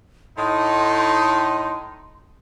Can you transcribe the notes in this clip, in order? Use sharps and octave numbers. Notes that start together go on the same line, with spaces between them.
A2 D#4 C6